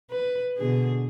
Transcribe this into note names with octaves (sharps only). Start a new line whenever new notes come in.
B4
B2 D3 G#4